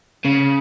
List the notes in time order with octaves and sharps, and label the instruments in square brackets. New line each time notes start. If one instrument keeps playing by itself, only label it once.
[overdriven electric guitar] C#3